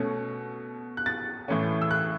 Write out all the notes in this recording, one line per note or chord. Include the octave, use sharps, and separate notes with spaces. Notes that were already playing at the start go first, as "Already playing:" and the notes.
Already playing: B2 A3 C#4
F#6
A6
A2 E3 A3 C#4
E6
F#6